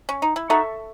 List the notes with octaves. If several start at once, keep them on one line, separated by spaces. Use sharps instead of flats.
C#4
D#4
E4
D#4 F#4 A4 E5 A5 C#6